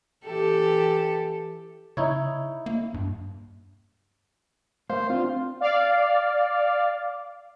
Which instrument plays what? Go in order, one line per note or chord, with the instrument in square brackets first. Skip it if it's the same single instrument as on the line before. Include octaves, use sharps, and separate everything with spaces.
[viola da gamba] E3 G4 A4
[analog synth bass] C#3 [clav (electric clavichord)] D#4 E4 C#5
[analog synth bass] A#3
G2
[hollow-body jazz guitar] A3 A#4 F5 [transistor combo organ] C5
[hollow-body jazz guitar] C4 D4 [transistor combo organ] F4
[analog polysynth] D5 F5